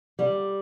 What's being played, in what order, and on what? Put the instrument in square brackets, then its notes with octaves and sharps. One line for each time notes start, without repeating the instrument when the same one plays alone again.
[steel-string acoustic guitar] G3